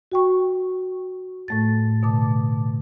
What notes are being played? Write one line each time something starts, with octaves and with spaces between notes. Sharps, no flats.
F#4 G5 C#6
A2 A3 A6
B2 D3 A5 D6